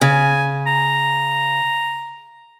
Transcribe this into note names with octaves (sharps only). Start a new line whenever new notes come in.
C#3 G#5
A#5